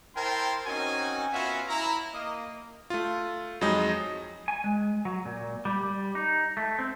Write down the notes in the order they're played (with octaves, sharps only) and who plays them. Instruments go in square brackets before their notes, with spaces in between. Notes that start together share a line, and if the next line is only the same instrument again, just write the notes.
[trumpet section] E4 A#4 C5 G5 A5 C6
C4 C#4 D#4 F#4 A#4 G#5
B3 C#4 F4 F#4 C#5 E5
E4 A#5
A#3 D#5
[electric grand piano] A3 F4
F2 F#3 G#3 D#4 D#5
[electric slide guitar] G#5
G#3
F#3
A#2
G3
G3
D#4
A3
C4